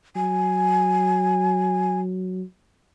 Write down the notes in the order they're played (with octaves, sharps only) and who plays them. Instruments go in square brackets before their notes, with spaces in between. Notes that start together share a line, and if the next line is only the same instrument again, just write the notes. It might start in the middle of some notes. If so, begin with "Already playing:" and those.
[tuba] F#3 [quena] G#5